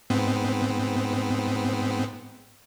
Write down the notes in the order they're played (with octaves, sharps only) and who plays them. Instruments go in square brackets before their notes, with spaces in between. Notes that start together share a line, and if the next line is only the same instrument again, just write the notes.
[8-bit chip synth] G#2 B3 C4